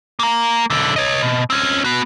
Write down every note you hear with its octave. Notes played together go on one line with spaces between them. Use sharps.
A#3 A#5
B1 D3
C#5 D#5
B2
C4 C#4
B3 F#4